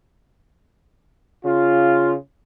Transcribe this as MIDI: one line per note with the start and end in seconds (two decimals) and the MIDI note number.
1.46 2.14 49
1.46 2.14 65